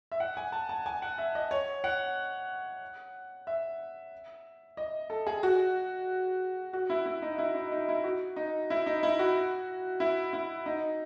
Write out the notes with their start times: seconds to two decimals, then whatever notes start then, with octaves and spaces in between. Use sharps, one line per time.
0.12 E5
0.20 F#5
0.37 G#5
0.52 A5
0.69 A5
0.86 G#5
1.02 F#5
1.18 E5
1.35 D#5
1.51 C#5
1.84 F#5
3.47 E5
4.77 D#5
5.10 A4
5.27 G#4
5.43 F#4
6.73 F#4
6.90 E4
7.06 E4
7.22 D#4
7.38 E4
7.55 D#4
7.72 D#4
7.89 E4
8.04 F#4
8.36 D#4
8.70 E4
8.86 D#4
9.03 E4
9.19 F#4
10.00 E4
10.33 E4
10.66 D#4